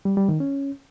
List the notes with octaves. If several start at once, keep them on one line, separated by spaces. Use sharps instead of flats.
G3
G3
D#3
C#4